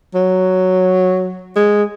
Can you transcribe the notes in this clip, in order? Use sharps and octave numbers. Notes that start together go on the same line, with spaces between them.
F#3
G#3